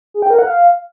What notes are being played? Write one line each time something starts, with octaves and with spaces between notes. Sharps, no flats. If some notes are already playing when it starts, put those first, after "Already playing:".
G#4
G5
A#4
F#5
F5